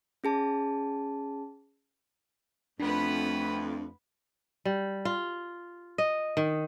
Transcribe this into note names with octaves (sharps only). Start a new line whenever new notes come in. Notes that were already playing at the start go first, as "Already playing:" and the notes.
C#4 G#4 A5
F2 A3 B3 C4 D4 B4
G3
F4
D#5
D#3